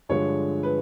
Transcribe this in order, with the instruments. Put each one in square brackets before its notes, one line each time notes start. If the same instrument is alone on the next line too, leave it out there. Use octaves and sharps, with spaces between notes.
[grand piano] G2 D3 F3 G#3 C#5
B4